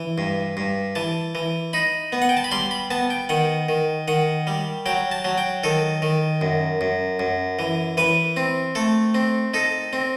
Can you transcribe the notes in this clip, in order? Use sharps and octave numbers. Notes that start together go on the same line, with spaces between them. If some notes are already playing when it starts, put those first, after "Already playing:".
Already playing: E3
G2
G2
E3 A5
E3
D#4 B5
B3
F#5
G5
A5
B5
G3 C6
B5
B3 A5
G5
D#3 F#5
D#3
D#3 F#5
G3
F#3 G5
A5
F#3
G5
D#3 A4
D#3
F#2
F#2
F#2
E3
E3 B4
C4
A3 A4
C4
D#4 A4
C4